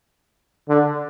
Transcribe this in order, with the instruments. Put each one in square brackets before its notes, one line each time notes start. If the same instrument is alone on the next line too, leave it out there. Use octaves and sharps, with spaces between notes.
[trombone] D3